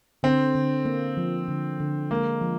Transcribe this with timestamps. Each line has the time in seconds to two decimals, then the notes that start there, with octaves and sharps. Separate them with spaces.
0.23 D3 C4
0.55 D3
0.85 A#3
1.17 F3
1.49 D3
1.80 D3
2.10 G#3 A#3
2.42 F3